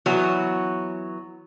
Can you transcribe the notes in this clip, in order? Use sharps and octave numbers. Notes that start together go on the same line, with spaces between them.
E3 F#3 B3 C#5